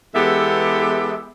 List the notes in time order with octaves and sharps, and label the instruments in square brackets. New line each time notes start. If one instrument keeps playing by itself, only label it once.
[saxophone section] E2 G#3 B3 G4 A4 E5